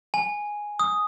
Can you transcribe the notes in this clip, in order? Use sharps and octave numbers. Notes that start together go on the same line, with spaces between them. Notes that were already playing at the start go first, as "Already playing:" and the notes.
G#5
D#6